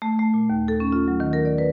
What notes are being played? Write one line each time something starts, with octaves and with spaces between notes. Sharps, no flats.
A3
A3
A#2
D#2
A4
C#4
F4
F#3
D#3
A#4
D5
B4